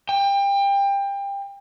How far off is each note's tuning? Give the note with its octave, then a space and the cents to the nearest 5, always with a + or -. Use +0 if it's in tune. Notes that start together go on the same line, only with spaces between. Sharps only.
G5 +25